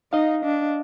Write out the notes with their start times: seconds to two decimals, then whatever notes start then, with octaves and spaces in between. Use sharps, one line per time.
0.13 D#4 D#5 F5
0.45 D4